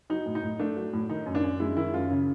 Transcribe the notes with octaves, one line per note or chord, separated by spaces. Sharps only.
F#3 D#4
A2
D#4
A2
A3 D4
F#3
A2
D#3 D#4
F#2
D4
F#2
G#3 E4
D#3 E4
F#2 F4
C#3